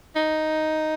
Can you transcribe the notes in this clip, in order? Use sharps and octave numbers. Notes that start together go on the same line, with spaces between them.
D#4